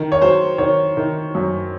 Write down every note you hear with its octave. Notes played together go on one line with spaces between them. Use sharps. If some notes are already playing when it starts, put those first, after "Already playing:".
Already playing: D#3
C#5
F#3 C5
D#3 C#5
D#3
F#2